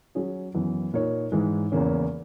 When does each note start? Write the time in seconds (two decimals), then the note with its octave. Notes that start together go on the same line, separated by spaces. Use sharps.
0.15 F#3 C#4 G#4
0.54 F#2 E3 B3
0.93 A#2 A#3 D#4 A#4 C#5
1.32 G#2 E3 G#3
1.72 E2 C#3 E3 A#3 C#4